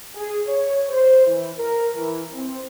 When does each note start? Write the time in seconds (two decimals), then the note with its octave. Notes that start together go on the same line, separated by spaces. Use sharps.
0.13 G#4
0.46 C#5
0.89 C5
1.25 E3
1.56 A#4
1.94 E3
2.33 C4